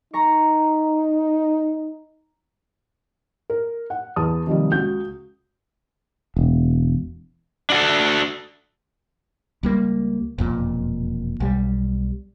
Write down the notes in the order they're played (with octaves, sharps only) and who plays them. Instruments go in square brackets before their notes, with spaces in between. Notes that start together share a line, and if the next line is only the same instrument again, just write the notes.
[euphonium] D#4 [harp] A#5 C#6
[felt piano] A#4
F#5
E2 A5 D#6
C3 D#3 F3 G3
C#2 F#4 G6
[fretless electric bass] E1
[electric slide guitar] D4 F#4 A4
[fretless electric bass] C#2 G3 A#3
E1 F2 A#2
B1 G3